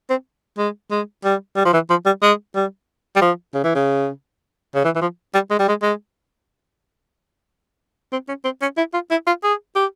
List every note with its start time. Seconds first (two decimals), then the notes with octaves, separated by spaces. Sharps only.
0.10 C4
0.58 G#3
0.91 G#3
1.25 G3
1.56 G3
1.65 F3
1.74 E3
1.90 F3
2.06 G3
2.22 G#3
2.55 G3
3.16 G3
3.21 F3
3.54 C#3
3.64 E3
3.75 C#3
4.75 C#3
4.85 E3
4.96 E3
5.02 F3
5.34 G3
5.51 G#3
5.59 G3
5.68 G#3
5.83 G#3
8.12 C4
8.28 C#4
8.44 C4
8.62 C#4
8.78 E4
8.94 F4
9.11 E4
9.27 F4
9.44 G#4
9.76 G4